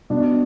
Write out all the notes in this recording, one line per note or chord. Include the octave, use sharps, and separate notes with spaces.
B2 D4